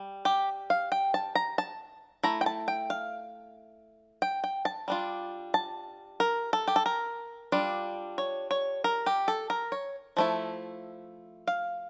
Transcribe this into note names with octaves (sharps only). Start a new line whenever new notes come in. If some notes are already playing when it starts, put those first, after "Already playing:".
Already playing: G3
G4
F5
G5
A5
A#5
A5
A3 E4 A#5
G5
A5
G5
F5
G5
G5
A5
G3 D4 F4
A5
A#4
A4
G4
A4
A#4
G3 D4 F4
C#5
C#5
A#4
G4
A4
A#4
C#5
F3 A3 E4
F5